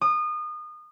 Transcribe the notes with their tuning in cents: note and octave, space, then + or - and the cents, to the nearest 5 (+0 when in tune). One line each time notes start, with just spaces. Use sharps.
D#6 -30